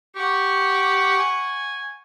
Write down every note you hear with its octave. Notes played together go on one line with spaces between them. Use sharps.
G4 F#5 C#6
G#5